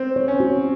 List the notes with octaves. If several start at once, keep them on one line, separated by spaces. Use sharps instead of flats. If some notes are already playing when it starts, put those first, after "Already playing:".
Already playing: C4
C#5
C#4
F#4